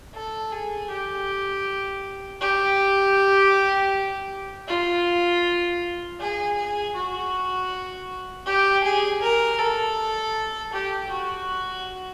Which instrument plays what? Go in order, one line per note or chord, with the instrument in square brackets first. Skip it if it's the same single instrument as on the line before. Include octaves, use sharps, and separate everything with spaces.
[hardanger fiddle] A4
G#4
G4
G4
F4
G#4
G#4
F#4
G4
G#4
A#4
A4
G4
F#4